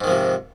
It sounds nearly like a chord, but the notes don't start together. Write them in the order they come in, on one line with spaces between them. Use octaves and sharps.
G#2 D#3 F3 C3